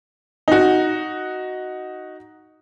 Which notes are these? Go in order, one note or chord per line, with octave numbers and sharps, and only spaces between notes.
D#4 F#4